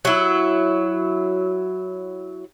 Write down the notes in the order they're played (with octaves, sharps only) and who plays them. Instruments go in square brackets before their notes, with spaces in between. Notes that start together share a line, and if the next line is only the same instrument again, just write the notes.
[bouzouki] F#3 E4